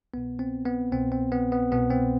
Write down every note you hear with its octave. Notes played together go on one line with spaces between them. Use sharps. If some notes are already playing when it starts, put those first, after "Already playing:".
C2 B2 B3
C4
B3
C2 B2 C4
C4
B3
B3
C2 B2 B3
C4